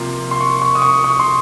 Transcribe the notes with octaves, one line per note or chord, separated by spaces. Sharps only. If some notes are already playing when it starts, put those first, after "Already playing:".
Already playing: C3 F3 A#3 C6
C6
C#6
C#6
D#6
C#6
C#6
C6